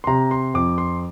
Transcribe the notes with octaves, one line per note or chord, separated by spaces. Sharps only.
C6
C3 A#5
C6
F2 D6
C6